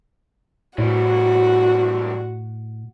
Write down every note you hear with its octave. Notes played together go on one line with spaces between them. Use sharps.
A2 E3 G3 F#4